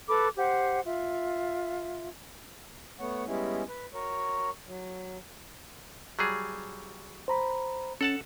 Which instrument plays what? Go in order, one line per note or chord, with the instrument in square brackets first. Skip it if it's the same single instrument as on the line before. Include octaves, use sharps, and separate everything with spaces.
[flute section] A4 B4 B5 D6
G4 C5 F#5
F4 E5
[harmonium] A3 B3 C#5 F#5
G3 G#3 B3 C#4 E4
B4
F#4 A#4 C#5
F#3
[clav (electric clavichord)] F#3 G3 G#4
[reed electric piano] C5 A#5 B5
[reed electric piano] C#4 [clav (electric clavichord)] A4 F#5 A5